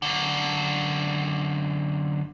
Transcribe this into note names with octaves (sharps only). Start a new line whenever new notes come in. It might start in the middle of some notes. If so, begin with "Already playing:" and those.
F#2 D3